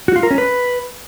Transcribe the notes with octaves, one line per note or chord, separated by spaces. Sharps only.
F#4
F4
A#4
C#4
B4